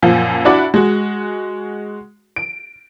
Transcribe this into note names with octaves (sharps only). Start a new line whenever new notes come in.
F#2 A#2 F3
D4 E4 F#4 D5 F#5 B5
G#3 F#4
D7